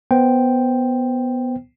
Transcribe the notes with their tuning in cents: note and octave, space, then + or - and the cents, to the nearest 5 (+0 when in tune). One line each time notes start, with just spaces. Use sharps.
B3 +0 C5 +0 G5 +0